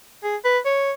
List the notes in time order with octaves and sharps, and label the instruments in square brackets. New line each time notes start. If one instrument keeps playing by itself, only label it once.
[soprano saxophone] G#4
B4
C#5